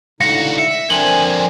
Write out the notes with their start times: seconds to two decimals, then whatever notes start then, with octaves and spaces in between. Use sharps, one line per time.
0.20 C#2 A2 D3 D#4 F#4 F5 A#6 C#7
0.58 E5 C#7
0.90 D3 F3 C4 D4 A#4 G#5 F#7 G7